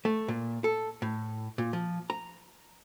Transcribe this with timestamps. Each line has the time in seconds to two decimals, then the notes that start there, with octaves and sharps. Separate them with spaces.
0.05 A3
0.28 A#2
0.64 A4
1.02 A2
1.58 A#2
1.73 F3
2.10 A#5